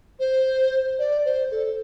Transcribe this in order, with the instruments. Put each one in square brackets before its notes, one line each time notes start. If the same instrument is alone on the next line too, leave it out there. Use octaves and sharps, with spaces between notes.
[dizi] C5
D5
C5
A4